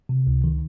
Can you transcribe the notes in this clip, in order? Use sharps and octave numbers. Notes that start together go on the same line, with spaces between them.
C3
C#2
D#3